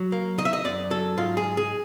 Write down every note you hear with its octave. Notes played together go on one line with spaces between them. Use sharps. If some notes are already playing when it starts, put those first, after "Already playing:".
Already playing: F#3
A#3
D#3 D#5
E5
D#5
F#2 D5
F#3 A4
G#2 F4
G#4
G#3
G#4